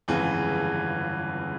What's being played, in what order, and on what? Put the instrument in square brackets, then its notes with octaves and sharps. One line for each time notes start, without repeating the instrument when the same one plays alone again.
[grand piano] G1 F2 C#3 E3 G#3